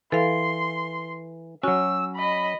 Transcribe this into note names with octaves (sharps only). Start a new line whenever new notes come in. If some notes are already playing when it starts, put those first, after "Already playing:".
E3 A4 F5 C6
F#3 C#4 F#4 E6
D#5 B5